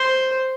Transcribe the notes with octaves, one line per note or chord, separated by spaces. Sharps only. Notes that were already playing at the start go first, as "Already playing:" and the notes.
Already playing: C5